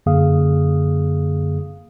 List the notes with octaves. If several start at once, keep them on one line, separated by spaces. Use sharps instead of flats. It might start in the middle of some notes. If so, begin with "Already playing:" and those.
F#2 D3 A#3 G#4 F5 D#6